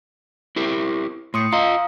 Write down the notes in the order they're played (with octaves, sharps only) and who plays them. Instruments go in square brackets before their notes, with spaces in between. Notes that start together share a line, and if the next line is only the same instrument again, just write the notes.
[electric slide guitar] E4 G4 A#4
[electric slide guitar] A2 [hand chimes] C6 D#6 C#7
[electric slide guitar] F4 D#5 [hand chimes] F5 A#5 D#6